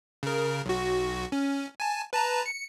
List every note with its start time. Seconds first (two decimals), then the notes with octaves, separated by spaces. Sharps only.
0.23 C#3 A#4
0.66 B1 F#4
1.32 C#4
1.80 G#5 A5
2.13 B4 A5 A#5
2.46 C#7